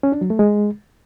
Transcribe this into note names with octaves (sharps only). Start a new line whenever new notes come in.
C#4
D4
F#3
A3
G#3